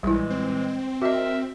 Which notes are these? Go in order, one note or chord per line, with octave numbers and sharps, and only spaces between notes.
A#1 A#2 E3 G3 G#3 E4
C4
F#4 A#4 D#5 E5